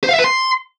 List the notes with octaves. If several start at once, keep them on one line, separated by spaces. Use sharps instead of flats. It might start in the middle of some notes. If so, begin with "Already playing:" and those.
C5
F5
E5
B4
C6